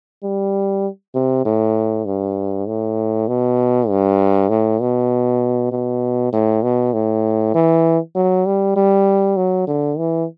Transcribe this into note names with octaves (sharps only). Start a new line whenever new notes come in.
G3
C3
A2
G2
A2
B2
G2
A2
B2
B2
A2
B2
A2
E3
F#3
G3
G3
F#3
D3
E3